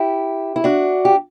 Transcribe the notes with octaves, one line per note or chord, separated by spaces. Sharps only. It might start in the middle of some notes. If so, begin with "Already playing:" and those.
Already playing: E4 G4
E4
D4 F#4
G4